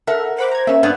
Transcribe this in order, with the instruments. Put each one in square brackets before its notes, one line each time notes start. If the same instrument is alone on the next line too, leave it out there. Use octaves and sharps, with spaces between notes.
[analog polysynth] A4 E5 F#5 [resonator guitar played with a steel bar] A#4
[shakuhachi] C5 [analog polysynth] F#5 B5 D6
[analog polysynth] A#5 G#6
[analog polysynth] A#3 C#4 [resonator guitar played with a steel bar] E5
[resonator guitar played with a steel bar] G2 B3 D4